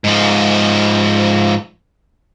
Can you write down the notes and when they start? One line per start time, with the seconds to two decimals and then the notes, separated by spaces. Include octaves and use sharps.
0.04 G#2 F3